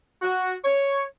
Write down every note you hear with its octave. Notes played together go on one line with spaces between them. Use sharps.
F#4
C#5